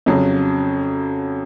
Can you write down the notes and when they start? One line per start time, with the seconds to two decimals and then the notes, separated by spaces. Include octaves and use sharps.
0.06 F2 C#3 F#3